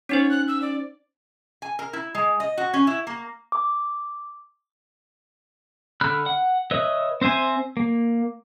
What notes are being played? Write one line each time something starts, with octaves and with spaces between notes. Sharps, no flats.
C#4 D#4 C5 C#5
F#6
E6
D5
G#5
A#4
E4
G#3
D#5
F#4
C#4
E4
A#3
D6
D3 B5 F6 F#6
F#5
B4 C#5 D#5 E5
C4 C5 E5 G#5
A#3